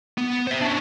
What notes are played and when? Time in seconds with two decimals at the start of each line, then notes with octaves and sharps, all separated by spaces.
0.18 B3
0.47 C5 E5
0.61 C#4 D4